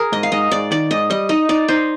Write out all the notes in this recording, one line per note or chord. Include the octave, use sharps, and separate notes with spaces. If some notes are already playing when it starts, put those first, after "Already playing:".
Already playing: G#4 A#4
G#2 D#5
F5
G#2 D#5
G#2 D5
D#3 D5
G#2 D#5
G3 D#5
D#4 D#5
D#4 D5
D#4 C5